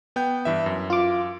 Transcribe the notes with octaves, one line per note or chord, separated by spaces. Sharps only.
B3 G5 G6
G2 E3 E5
F#2
F4 D6